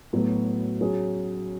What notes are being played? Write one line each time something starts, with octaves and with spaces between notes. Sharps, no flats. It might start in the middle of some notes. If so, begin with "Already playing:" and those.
A2 F#3 B3 F#4
F#3 C#4 G#4